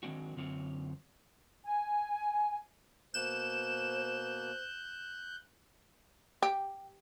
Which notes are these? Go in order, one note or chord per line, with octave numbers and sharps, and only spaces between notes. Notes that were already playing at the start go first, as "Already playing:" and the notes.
D#3 F#3 G#3 C4 D4 F#4
F#2 D3 C4 F4 C#5
G#5
B2 A#3 C5 F#6 G6 E7
G4